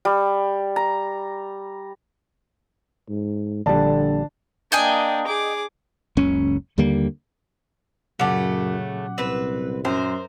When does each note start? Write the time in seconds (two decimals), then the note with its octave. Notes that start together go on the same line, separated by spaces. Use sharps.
0.05 G3
0.76 A#5
3.09 G#2
3.66 A#1 D3 G3 D4 A5
4.72 A#3 D4 D#5 G5 G#5
5.27 G#4 D6
6.17 F#1 C#2 C#4
6.78 D#2 D3 G3 A#3
8.19 F#2 A#2 C#3 F#3 A3 C#4 F#5 D6
9.18 C2 C4 B4
9.85 F#2 A#4 C5